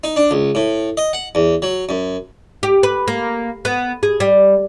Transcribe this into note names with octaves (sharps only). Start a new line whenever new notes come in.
D#4
D4
C#2
A2
D#5
F#5
E2
F#3
F#2
G4
B4
A#3
B3
G#4
G3